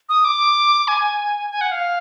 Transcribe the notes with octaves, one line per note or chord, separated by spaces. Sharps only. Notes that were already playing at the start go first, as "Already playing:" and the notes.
D#6
D6
G#5
G#5
F#5
F5